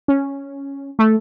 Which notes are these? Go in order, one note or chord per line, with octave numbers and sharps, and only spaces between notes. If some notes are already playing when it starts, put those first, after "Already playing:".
C#4
A3